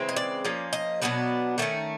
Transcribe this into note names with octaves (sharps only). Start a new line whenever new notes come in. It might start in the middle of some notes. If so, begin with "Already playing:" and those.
Already playing: C#3 E3 G#3 C4
D#5
D5
F3 A#3 C#4
D#5
B2 F#3 B3 D4
D#3 F#3 A3 C#4